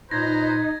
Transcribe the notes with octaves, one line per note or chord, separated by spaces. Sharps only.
A#2 D#4 B4 C5 A#5 G#6 A#6